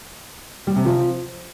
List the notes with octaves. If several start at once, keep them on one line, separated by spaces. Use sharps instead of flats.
G3
C3
F3